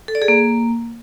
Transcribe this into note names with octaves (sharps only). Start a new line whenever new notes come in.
A4
D5
G#4
A#3